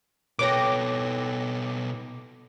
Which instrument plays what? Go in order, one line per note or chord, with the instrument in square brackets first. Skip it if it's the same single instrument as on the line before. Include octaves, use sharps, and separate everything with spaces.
[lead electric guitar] B2 A4 [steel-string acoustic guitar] B4 C#5 G5 [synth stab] D6 A#6